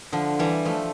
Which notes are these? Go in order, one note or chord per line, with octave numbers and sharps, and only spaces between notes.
D3 F3
E3 G3
F3 A3